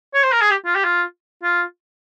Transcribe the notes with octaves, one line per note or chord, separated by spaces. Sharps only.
C#5
C5
A#4
G#4
G4
F4
G4
F4
F4